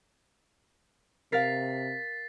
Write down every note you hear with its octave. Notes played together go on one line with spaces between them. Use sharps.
C3 A#4 F5 A6 B6 C7